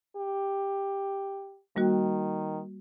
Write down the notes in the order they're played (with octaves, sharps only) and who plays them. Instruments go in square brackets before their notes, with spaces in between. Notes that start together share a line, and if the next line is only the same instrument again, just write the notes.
[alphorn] G4
[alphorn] D#3 [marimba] G3 A#3 F#4